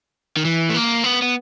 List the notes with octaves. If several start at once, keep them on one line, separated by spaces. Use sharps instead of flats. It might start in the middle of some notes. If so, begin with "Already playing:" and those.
D#3
E3
A3
A#3
B3
B3